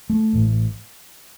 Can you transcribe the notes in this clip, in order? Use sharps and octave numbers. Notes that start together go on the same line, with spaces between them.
A3
A1 A2